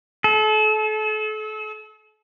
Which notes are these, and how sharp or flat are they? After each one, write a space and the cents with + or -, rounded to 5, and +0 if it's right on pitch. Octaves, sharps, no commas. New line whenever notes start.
A4 -35